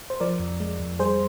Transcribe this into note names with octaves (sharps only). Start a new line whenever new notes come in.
C5
F3 A#4 D5
F2
G#3
F2
G3 G#4 C5